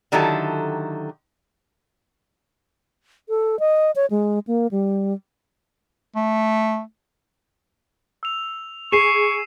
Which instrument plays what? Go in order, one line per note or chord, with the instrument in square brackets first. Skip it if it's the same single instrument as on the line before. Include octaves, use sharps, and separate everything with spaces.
[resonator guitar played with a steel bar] D3 D#3 F#3 E4 G4 A4
[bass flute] A4
D#5
C#5
G#3
A#3
G3
[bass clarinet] A3
[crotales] E6 F7
[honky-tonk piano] G#4 [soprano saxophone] C#6 [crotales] C7 D#7 E7